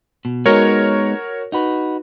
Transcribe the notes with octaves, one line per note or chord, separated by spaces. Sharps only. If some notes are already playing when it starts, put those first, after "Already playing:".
B2
G#3 B3 D#4 F#4 A#4 C#5
D#4 F#4 B4